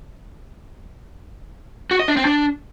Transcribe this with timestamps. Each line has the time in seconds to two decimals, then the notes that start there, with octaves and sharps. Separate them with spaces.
1.91 F#4
2.00 D#5
2.08 D4
2.17 C4
2.25 D4